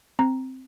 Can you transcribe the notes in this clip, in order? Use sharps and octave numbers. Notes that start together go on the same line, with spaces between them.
C4 A#5